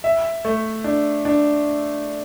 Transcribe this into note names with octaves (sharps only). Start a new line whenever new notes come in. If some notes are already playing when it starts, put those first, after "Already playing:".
E5
A3
D4
D4